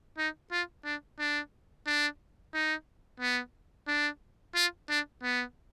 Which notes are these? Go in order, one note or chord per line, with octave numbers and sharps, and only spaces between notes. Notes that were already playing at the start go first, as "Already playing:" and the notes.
D#4
F4
D4
D4
D4
D#4
B3
D4
F4
D4
B3